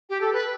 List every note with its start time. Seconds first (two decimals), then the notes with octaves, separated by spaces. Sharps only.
0.10 G4
0.21 A4
0.33 B4